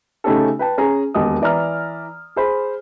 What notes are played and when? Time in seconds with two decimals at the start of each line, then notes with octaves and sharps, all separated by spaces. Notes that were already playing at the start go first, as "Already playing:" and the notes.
0.24 C#3 A3 C#4 D#4 G4 A4
0.59 B4 G5 A5
0.78 C#4 G#4 A#5
1.14 E1 D#2 D#5 D#6
1.42 E3 D5 E5 A#5 F6
2.36 G#4 C5 B5